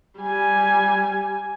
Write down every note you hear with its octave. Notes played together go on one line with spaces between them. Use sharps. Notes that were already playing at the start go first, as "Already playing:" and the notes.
G3 G#5